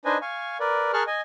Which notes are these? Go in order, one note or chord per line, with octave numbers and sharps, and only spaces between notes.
D4 D#4 B4 C5 D#5 G#5
F5 G#5 C#6
A#4 B4 D5
G#4 A#4 A5 C#6 F6 F#6
D#5 G#5